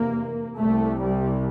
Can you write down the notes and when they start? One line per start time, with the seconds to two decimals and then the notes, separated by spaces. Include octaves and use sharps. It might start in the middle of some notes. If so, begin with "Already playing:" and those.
Already playing: F1 E2 C3 A#3
0.59 C2 C3 A3
1.02 G3